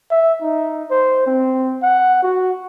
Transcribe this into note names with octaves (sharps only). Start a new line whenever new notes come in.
E5
D#4
C5
C4
F#5
F#4